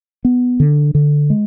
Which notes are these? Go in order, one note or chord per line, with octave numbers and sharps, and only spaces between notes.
B3
D3
D3
G#3